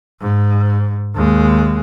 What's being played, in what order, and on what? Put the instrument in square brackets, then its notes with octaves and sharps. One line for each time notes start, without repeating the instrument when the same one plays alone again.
[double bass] G#2
D#2 G#3